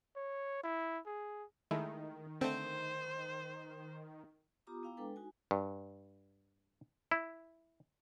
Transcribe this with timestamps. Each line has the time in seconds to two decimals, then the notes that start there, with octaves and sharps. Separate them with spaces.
0.16 C#5
0.64 E4
1.06 G#4
1.71 D#3 G#3 A3 E4
2.41 D3 A3 C4 C5
4.67 B3 F4 G4 A#5 D6 D#6
4.83 B3 E4 F5 G5 A#5 D6
4.97 G#3 D4 A4 B4 G5
5.16 D#4 F#4 G#5
5.51 G2
7.11 E4